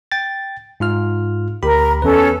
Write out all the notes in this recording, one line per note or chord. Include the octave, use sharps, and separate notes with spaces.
G5 A6
G#2 F4 F6
D2 G4 A#4 B5
E2 C#4 A4 B4